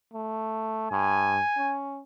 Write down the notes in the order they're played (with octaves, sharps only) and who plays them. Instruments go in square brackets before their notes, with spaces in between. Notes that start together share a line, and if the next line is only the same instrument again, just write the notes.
[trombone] A3
[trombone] G2 [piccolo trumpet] G#5
[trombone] C#4